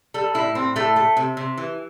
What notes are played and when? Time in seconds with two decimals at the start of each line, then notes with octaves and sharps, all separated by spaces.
0.14 G3 A4
0.34 A2 E4
0.55 A2 C4
0.76 A2 A3
0.96 A3
1.17 C3
1.37 C3
1.57 E3